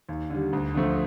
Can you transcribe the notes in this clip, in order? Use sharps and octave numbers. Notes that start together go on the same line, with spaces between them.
D#2
D3 G3
D2
D3 F3 A3